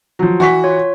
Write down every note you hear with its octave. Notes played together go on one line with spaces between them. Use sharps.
F3 F#3
E3 F#4 C#6 B6
F4 C#5